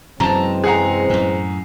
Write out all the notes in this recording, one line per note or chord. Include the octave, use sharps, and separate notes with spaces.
F#2 C3 E3 F#3 G#3 C4 A5 A#5
G#4 F#5 A#5
F#2 A2